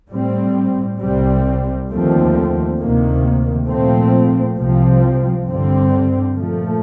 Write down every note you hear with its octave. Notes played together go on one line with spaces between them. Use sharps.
A2 G3 C4
C2 C3 G3 C4
D#2 D3 F3 A3 C4
D2 C3 D#3 A#3
A#2 F3 A3 C4
C2 C3 F3 C4
G2 D3 G3 C4
A#2 F3 A3